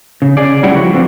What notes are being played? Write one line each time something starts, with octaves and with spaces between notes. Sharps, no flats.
C#3
C#3 G#4 D5
F#3 G3 E4 C#5 F#5 G5
F3 F#4 B4
D3 F3 C4